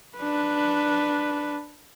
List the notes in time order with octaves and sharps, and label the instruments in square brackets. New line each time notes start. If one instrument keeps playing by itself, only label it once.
[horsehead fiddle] D4 B4